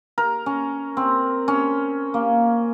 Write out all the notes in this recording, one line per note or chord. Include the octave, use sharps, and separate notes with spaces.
A#4
C#4
C4
C#4
A#3